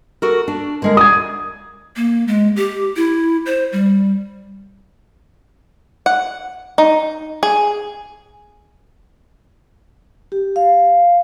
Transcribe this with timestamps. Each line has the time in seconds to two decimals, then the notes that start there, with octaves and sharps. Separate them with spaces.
0.22 F#4 A4 A#4
0.48 D4
0.82 D3 G#3 A#4
0.97 D5 D#6 G#6
1.96 A#3
2.28 G#3
2.56 G4
2.96 E4
3.46 C5
3.72 G3
6.06 F#5
6.78 D#4
7.43 G#4
10.32 G4
10.56 F5